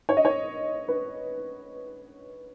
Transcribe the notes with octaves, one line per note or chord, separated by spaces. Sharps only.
C#5
D#5
C#5
B4